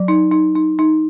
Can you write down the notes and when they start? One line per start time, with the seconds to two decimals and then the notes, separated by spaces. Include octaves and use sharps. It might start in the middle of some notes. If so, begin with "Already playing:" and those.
Already playing: F#3
0.08 D#4
0.31 D#4
0.56 D#4
0.79 D#4